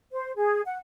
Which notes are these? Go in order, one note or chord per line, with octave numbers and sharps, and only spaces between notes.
C5
G#4
F#5